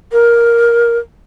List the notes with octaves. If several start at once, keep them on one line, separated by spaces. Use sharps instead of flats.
A#4